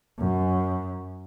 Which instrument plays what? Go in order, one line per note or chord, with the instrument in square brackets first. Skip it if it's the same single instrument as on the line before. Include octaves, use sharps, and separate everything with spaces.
[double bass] F#2